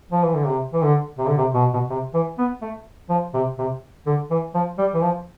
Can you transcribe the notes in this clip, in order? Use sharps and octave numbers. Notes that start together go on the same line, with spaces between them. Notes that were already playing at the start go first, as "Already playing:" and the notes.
F3
E3
D3
C3
E3
D3
C3
D3
C3
B2
B2
C3
E3
B3
A3
F3
C3
C3
D3
E3
F3
G3
E3
F3